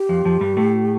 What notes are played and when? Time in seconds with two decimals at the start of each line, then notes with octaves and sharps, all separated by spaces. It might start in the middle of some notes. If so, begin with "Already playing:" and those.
Already playing: G4
0.09 F2 F3
0.25 F2 F3
0.41 G2 G3
0.57 A2 A3